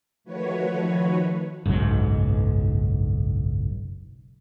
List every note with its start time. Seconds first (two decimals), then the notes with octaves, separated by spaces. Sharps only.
0.24 D#3 F3 A3 F#4 B4 C#5
1.66 F#1 B1 G#2 F#3